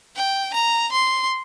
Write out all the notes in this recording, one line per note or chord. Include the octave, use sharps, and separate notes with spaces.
G5
A#5
C6